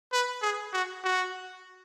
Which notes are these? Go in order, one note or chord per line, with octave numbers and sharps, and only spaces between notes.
B4
G#4
F#4
F#4